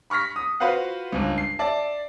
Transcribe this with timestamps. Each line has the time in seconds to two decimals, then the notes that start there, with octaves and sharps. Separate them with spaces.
0.10 B5 C#6 F6 A#6 B6
0.36 D#6
0.60 F4 F#4 B4 C5 F5 F#5
1.12 G1 C#2
1.38 C7
1.59 D5 E5 A5